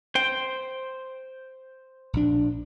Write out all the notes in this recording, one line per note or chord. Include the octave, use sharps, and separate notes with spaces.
C5 G5
A#1 D4